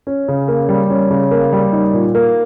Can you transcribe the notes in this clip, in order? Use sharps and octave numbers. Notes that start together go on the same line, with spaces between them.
C#4
C#3
A#3
G3
C#4
C#3
A#3
G3
D#4
A#2
A#3